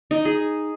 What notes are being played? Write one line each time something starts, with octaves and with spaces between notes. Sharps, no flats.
D#4
G#4